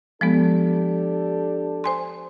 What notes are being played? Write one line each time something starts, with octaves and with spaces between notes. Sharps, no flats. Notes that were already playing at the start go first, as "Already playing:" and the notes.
F3 G#3 B3 D4 G4 A4
C5 G#5 C6